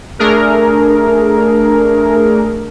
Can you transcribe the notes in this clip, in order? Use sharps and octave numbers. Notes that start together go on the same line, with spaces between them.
A3 D4 G#4 A#4